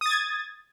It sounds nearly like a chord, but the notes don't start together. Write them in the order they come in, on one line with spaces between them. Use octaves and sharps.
D#6 A6 G#6